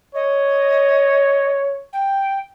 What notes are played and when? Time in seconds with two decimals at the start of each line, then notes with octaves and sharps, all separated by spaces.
0.15 C#5 D#5
1.93 G5